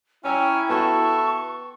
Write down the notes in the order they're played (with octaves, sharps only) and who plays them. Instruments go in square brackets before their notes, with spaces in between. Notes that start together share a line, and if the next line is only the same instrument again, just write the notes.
[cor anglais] C#4 [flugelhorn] E4 [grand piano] C#5 A#5 E6 [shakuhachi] G5
[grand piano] B3 F#4 G5 [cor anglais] A4 [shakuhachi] C#6